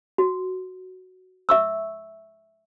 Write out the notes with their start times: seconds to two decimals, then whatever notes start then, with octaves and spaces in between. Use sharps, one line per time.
0.18 F#4
1.49 E5 C#6 E6